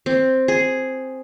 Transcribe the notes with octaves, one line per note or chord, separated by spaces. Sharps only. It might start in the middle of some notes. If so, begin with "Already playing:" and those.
C4
G#4